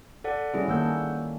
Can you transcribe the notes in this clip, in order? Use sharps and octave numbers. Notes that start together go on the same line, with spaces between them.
A4 D5 F#5
G3 C#4 E4 G#4
D#3 A#3 A4 F#5 E6 G6